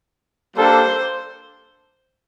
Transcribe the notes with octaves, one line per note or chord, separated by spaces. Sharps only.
G3 A#3 D4 A4 C5